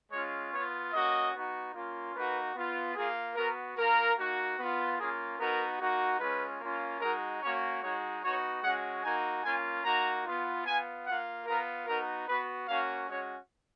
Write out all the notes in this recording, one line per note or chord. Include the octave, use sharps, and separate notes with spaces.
G#3 C#4 F4 C#5
B3 F4 C#5
A#3 C#4 F#4 D#5
B3 D#4 F#4
A#3 C#4 F4
A#3 D#4 F#4 B4
B3 F4
A#3 F4 G#4
B3 F#4 A#4
A#3 F4 A#4
A#3 D#4 F#4
B3 F4
A#3 C#4 F4 G#4
B3 D#4 F#4 A#4
A#3 D#4 F#4
G#3 C#4 F4 B4
A#3 C#4 F4
G#3 D#4 F#4 A#4
A#3 C#4 F#4 C#5
G#3 D#4 F#4 C#5
B3 D#4 F#4 C#5
G#3 C#4 F#4 F#5
A#3 D#4 F#4 G#5
A#3 C#4 F4 G#5
A#3 D#4 F#4 A#5
B3 F4
B3 F4 G#5
A#3 F4 F#5
B3 F4 A#4
B3 D#4 F#4 A#4
B3 F#4 B4
A#3 C#4 F#4 F5
G#3 C#4 F#4 C#5